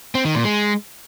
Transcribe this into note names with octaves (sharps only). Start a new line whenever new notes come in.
C4
D#3
A#2
G#3